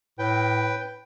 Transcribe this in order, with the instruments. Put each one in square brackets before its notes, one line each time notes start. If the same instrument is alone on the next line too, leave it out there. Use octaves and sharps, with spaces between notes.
[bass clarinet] A2 [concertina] B4 G5